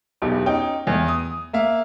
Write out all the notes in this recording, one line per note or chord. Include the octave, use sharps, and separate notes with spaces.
E1 B1 G4
C#4 D#4 G5
E2
D#6
A#3 E5 F5